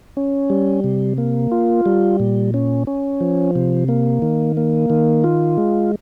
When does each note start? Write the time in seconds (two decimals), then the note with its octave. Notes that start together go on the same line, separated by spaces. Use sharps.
0.17 C#4
0.50 G3
0.84 C3
1.18 A#3
1.51 F4
1.86 G3
2.20 A#2
2.54 C#4
2.87 C#4
3.21 F3
3.56 C3
3.88 A#3
4.22 D#3
4.57 A#3
4.90 D#3
5.24 F4
5.57 G#3